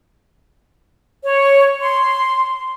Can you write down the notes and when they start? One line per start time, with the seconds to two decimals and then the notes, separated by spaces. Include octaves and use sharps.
1.24 C#5
1.81 C6